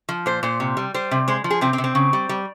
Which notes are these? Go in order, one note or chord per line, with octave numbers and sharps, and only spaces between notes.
F3
A#2 C5
A#2 C5
C3
G3
G3 C5
C3
G#3 C5
F3
G#4
C3 C4
C4
C3
C4
C#3
G3
G3